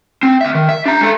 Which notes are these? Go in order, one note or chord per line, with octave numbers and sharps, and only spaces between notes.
C4
D2 E5
D#3
E5
D4 A#5
G#3 A4